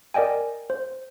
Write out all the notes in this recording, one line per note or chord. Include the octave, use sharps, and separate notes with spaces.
A#4 D5 D#5 G5 G#5
C5